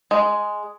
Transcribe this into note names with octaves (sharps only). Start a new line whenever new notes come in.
G#3